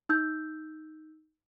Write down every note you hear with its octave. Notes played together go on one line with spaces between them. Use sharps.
D#4 E6 G6